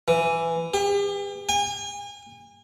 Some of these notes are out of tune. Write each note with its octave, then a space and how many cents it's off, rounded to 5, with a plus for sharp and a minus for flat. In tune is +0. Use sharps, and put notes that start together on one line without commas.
E3 +10
G4 +40
G#5 -35